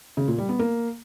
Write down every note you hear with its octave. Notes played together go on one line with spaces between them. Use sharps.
C#3
A#2
G3
B3
A#3